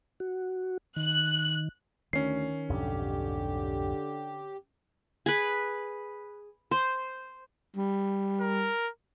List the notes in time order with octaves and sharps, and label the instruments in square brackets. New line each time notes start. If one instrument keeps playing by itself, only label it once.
[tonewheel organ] F#4
[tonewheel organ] D#3 [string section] F#6
[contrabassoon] D2 [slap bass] D#3 [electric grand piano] C#4 C7
[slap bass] B1 F2 G#2 [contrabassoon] D3 [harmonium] G4
[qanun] G#4 B4
C5
[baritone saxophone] G3
[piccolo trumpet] A#4